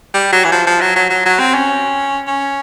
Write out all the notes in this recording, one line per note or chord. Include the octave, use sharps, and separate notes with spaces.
G3
F#3
E3
F3
F3
F#3
F#3
F#3
F#3
C4
C#4
C#4